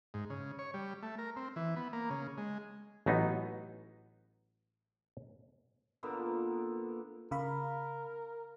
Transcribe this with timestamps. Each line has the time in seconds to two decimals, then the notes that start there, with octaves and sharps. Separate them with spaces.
0.14 G#2
0.30 C#3
0.59 C#5
0.74 G3
1.03 A3
1.18 A#4
1.36 C4
1.56 E3
1.76 B3
1.93 A#3
2.10 C#3
2.38 G#3
3.06 A1 F#3 B3 D#4
6.03 A#2 D3 A#3 B3
7.31 C#3 A#4 F5 B5